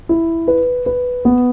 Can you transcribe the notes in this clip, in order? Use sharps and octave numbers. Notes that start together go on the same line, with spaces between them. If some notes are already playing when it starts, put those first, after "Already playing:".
E4
B4
B4
B3